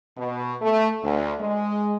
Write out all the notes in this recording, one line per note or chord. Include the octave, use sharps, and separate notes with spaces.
B2
A3
D2
G#3